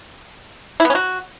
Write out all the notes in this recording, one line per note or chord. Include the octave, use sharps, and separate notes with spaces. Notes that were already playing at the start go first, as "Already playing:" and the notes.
E4
B3
C#4
F#4